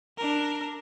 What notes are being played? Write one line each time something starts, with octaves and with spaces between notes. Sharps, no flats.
D4 A#4